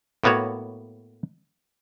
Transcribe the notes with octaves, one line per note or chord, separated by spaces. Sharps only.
A2 A#3 B3 F#4 C#5